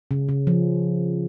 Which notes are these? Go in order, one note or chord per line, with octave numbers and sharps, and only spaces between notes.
C#3
C#3
F3